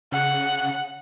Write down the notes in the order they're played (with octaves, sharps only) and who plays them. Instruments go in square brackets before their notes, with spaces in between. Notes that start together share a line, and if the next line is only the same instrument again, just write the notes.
[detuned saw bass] C#3 [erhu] F#5